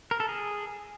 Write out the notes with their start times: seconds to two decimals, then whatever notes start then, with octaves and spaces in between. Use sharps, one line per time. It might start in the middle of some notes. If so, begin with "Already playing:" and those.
0.11 A#4
0.20 A4
0.29 G#4